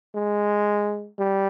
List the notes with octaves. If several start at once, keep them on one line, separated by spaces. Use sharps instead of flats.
G#3
G3